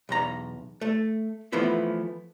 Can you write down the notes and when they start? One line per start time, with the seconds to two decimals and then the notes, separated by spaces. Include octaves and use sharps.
0.09 B1 E2 A#5
0.81 A3
1.52 E3 F3 A3 B3 E4